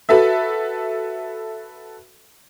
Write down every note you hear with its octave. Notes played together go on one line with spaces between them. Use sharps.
F#4 A4 B4 E5